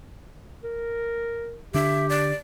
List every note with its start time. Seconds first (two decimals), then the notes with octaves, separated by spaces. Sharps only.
0.64 A#4
1.74 D3 D4 G4 E5
2.10 D5